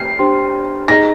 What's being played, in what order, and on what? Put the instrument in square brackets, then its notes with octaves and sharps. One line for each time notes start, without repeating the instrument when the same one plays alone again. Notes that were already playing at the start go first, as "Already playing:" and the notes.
Already playing: [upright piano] C7
[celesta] D4 G4 C5 G5 C6
[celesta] D#4 G#4 D#5 A#5 [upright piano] A#6